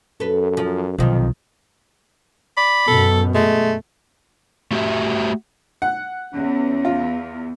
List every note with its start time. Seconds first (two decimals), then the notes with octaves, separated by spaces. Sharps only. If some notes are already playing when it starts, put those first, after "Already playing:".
0.20 F#2 A4 B4
0.57 F3
0.98 B1 C3 D#3 F3
2.57 D5 B5
2.88 F#2 B2 A4
3.35 G#3 A3
4.71 A3 F#4 G4 E5
5.82 F#5
6.34 E2 C#4
6.85 F4